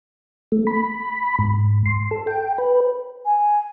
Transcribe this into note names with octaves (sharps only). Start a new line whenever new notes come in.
A3
B5
G#2
C6
A4
G5
B4
G#5